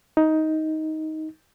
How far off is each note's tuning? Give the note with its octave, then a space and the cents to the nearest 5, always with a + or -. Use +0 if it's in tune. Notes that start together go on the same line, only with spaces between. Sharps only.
D#4 +10